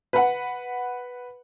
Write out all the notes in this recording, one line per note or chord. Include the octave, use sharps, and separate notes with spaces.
B4 F#5